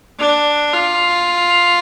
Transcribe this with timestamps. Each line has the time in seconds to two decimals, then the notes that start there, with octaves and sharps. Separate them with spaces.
0.19 D4
0.73 F4